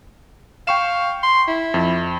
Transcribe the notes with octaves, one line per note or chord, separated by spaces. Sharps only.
F5 G5 C#6 E7
C6
E4
F2